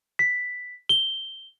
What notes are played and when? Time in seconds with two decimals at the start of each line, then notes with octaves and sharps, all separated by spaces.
0.19 B6
0.89 G7